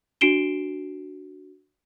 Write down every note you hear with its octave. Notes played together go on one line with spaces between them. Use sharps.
D4 F#4 C7 D7 E7 G7